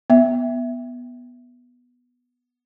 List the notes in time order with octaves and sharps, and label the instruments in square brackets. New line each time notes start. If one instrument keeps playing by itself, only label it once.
[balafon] B3 E5